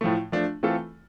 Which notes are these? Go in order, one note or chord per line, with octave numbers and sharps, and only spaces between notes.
A2 F3 A3
F3 A3 D4
E3 A3 C4 F4 A4